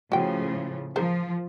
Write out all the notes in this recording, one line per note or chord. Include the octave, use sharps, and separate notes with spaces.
A2 C#3 F3 F#4 G5
F3 G#4 A#4 C5